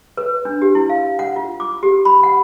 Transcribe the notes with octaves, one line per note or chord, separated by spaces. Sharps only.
B4
D4
G4
E4
F5
F#5
F4
D6
G4
B5
F#5